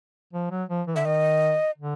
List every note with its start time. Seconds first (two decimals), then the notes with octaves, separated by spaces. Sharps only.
0.33 F3
0.51 F#3
0.69 F3
0.87 E3
0.96 D3 E5
1.05 D#3 D#5
1.78 D3